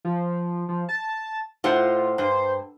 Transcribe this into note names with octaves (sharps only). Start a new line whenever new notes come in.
F3
F3
A5
A2 F4 C5 F#5
G2 C5